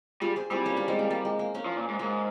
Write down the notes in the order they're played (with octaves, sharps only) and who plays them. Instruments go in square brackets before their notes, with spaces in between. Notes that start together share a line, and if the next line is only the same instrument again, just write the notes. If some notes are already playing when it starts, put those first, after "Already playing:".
[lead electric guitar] G3 [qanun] F4 G#4
[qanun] G#4 C5
[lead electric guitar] G3 [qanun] C4 E4
[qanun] A#3 C#4
A#3 C#4
G#3 C4
A#3
A#3
G#3
A#3
A#3 C#4
[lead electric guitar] F3
A#2
G#2
[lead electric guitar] G#2 [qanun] A#3